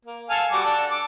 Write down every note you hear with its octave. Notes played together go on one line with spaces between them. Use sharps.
A#3
A4 F5 G#5
G3 F#4 D6
D4 A4
D6